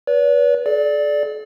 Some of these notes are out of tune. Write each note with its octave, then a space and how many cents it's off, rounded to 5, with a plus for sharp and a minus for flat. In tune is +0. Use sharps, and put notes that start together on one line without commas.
B4 -20 D5 -45
A4 -45 D5 +0